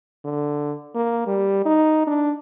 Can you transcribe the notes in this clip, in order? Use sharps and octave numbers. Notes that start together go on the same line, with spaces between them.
D3
A#3
G3
D#4
D4